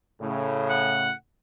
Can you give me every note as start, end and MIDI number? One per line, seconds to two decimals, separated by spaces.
0.22 1.11 45
0.22 1.11 49
0.70 1.12 78